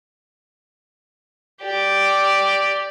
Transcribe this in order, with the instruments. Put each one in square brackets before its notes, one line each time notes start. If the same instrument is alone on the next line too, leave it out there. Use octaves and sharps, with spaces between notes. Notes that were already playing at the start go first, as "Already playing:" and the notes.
[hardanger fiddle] G4 D5